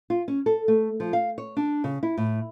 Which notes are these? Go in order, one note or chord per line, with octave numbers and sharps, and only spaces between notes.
F4
C#4
A4
A3
F3
F5
C#5
D4
C#3
E4
A2